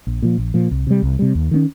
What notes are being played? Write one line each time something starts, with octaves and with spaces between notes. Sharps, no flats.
A#1
A#2 F3
A#1
A#2 F3
C2
C3 G3
C2
C3 G3
D#2
D#3 A#3 C#4